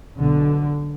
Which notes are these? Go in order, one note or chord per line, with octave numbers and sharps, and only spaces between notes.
B1 B2 D3